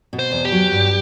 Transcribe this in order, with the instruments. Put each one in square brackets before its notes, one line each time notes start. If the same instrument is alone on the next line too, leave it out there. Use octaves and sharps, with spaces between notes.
[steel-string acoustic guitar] B2
[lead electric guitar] C5
[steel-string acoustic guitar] E2
[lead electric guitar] G4
[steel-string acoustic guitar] F#3
G2